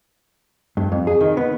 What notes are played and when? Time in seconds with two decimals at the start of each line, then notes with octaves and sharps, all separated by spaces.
0.77 G2
0.92 F2
1.07 G#4
1.21 D#3
1.37 B3